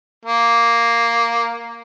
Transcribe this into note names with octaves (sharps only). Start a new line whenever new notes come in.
A#3